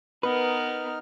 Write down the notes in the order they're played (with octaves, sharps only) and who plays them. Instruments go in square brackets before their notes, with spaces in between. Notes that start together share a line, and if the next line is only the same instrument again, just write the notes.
[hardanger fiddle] B3 A#4 [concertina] D#4 F6 [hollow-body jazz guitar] B4